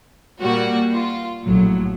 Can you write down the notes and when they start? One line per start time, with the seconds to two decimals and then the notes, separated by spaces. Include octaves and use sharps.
0.41 A#2 G3 A#3 F#4
0.92 F4
1.43 A#1 A2 F#3